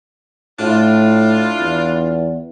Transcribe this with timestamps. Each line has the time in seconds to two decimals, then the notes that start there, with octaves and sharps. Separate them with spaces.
0.59 A2 D4 E4 F4
1.60 E2